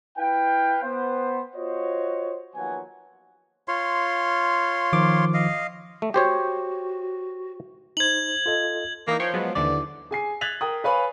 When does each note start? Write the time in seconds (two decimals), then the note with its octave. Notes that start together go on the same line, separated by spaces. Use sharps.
0.18 E4 B4 F5 G5
0.83 B3 C5
1.56 F4 F#4 C5 C#5 D#5
2.55 D#2 F3 F#3 B3 F#5 G#5
3.68 F4 C#5 C6
4.93 D#3 F3 D6
5.34 D#5 F5
6.02 A3
6.14 F#4 G4 C5 C#5
7.97 D#4 C5 G#6 F#7
8.46 F4 A4 D#5
9.08 E3 A#3 D#4
9.20 F3 C#5 G5 C6
9.34 F#3 G#3 B3
9.56 D#2 D3 E3 D5
10.11 G#4 G#5 C7
10.41 F#6 G#6 A6 B6 F7 F#7
10.61 A#4 G5 D#6
10.84 B4 C#5 F5 G#5 B5